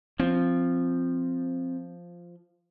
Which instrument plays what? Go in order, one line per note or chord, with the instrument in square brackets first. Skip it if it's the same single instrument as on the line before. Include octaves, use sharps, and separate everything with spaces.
[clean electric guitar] F3 [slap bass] C4